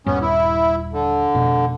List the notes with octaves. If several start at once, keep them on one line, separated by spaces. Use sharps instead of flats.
D#1 G2 B3 C#4
E4
D3
F1 B2